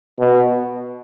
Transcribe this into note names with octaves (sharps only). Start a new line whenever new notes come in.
B2